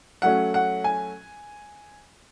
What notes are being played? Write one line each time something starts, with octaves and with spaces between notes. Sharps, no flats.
F#3 A3 C#4 F#5
F#5
G#5